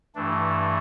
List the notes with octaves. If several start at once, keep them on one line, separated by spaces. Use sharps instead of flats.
G2 E3 A3 D4